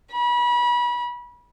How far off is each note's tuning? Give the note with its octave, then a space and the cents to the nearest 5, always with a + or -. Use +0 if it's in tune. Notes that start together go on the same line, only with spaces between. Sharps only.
B5 -30